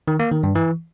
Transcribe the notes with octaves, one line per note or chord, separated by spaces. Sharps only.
D#3
A#3
D#3
G2
E3